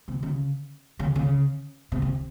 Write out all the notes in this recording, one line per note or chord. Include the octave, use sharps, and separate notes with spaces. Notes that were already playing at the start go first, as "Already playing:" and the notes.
C3
C#3
C#3
C#3
C3
C3